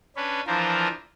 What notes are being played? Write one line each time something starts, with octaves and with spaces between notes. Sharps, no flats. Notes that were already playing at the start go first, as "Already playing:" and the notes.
C#4 D4 B4
E3 F3 D4 F4 A#4 C5